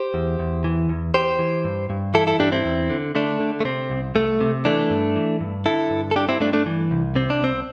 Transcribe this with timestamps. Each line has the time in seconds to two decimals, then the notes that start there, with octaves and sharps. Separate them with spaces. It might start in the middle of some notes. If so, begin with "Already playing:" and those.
Already playing: G4 C5
0.14 E2
0.39 E2
0.64 E3
0.89 E2
1.14 E2 G4 C5
1.39 E3
1.65 G2
1.90 G2
2.14 E3 E4 A4
2.27 E4 A4
2.40 G2 D4 G4
2.52 C4 E4
2.65 E2
2.90 D3
3.15 D3 A3 D4
3.40 D3
3.60 A3
3.65 C3 C4
3.90 C2
4.15 C2 A3
4.41 C3
4.65 E3 A3 D4
4.90 G2
5.16 E3
5.41 G2
5.66 D3 E4 A4
5.90 G2
6.11 A4
6.16 G2 D4 G4
6.29 C4 E4
6.40 G2 A3 D4
6.53 A3 D4
6.66 E3
6.91 C2
7.15 C3 C4
7.30 D4
7.41 C2 C4